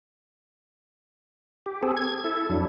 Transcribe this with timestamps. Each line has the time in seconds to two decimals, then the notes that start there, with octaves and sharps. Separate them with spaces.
1.66 G4
1.83 C4 G#4 A4
1.97 G#6
2.24 E4 A4
2.49 F2 F#3 D4 E4